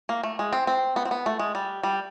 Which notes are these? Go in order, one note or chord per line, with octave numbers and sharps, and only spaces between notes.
A#3
A3
G#3
C4
C4
B3
C4
B3
A3
G#3
G3
G3